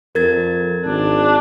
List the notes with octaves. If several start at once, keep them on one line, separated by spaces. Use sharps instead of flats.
F2 A#4 G#6 A6
G#1 D4